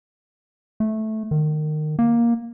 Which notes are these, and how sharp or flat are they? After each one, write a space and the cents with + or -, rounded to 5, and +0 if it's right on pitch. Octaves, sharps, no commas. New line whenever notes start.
A3 -10
D#3 -25
A#3 +10